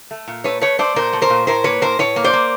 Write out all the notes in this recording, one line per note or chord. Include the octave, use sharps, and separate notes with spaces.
A3
A#2
A3 B4 C#5
A3 B4 C#5
A3 C5 D5
A#2 A#4 C5
A3
A#4 C5
A#2
A2 A#4 C5
A#3 B4 C#5
A2 A#4 C5
A2 B4 C#5
A#3
C5 D5
A#3